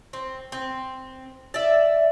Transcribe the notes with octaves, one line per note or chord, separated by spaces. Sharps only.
C4
C4
D5 E5